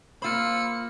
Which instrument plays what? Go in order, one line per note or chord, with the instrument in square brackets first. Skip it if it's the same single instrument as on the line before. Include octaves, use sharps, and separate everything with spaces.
[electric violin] A#3 C#7 [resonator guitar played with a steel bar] F4 C5 [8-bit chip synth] B5 E6 F6